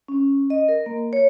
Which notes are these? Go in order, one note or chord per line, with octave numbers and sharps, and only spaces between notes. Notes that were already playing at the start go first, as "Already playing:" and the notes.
C#4
D#5
A#4
A#3
C#5